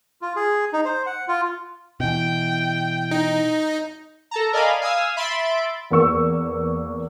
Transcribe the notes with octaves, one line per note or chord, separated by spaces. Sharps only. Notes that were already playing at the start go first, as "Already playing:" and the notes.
F4
G#4
D#4
C5
F#5
F4
B2 E3 G5
D#4
A4 A5 A#5
A#4 D5 D#5 F5 G#5 B5
F5 G#5 D#6 E6
E5 B5 C6 A6 B6 D7
E2 A#3 B3 C#6 E6